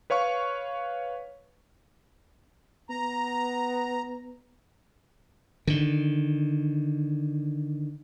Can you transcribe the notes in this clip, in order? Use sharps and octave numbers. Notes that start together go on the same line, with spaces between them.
B4 C#5 F5 C#6
B3 A#5
D3 D#3